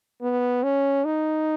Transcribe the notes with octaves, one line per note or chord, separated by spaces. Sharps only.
B3
C#4
D#4